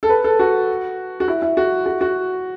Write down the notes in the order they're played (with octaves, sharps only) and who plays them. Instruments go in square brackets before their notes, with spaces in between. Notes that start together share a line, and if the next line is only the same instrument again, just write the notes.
[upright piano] A4
B4
A4
F#4
F#4
E4
E4
F#4
F#4
F#4